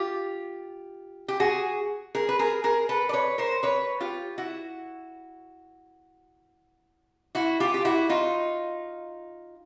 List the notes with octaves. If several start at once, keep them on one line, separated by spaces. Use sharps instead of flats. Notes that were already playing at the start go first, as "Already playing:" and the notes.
Already playing: F4 G4
G4
F#4 G#4
G#4 A#4
B4
G#4 A#4
G#4 A#4
A4 B4
D5
B4 C#5
A#4 C5
B4 C#5
F4 G4
E4 F#4
E4 F#4
F4 G4
G4
E4 F#4
D#4 F4